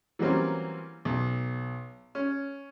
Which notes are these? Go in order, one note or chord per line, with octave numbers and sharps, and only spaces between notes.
E3 F#3 G3 A#3 C4 C#4
B1
C#4